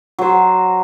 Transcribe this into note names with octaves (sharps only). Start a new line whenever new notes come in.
F#3 C5